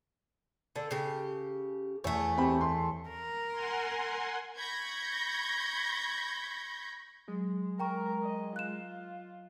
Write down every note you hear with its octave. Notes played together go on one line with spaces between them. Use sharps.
D3 A4
C#3 G4
E2 A3 C#5
C4 G4 B5
C6
A#4
F#5 G#5 C6
B5 C#6 G6 G#6 A#6
F#3 G#3
A#4 G5 A#5 C#6
D#5
F4 F#6 E7